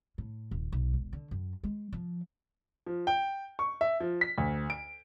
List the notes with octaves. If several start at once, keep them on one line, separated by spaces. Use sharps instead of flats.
A2
D#1
B1
E1
D3
F#2
G#3
F3
F3
G5
C#6
E5
F3
B6
D2
D7